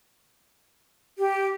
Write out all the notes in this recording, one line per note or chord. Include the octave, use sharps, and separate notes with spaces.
G4